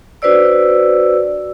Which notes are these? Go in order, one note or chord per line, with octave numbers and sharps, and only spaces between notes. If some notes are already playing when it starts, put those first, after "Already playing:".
D4 F#4 B4 C5 D5 E6